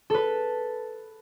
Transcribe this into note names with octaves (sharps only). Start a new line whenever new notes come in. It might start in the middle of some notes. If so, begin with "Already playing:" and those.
A4 B4